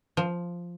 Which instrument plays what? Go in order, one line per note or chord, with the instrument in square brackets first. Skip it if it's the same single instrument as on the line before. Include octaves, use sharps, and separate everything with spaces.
[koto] F3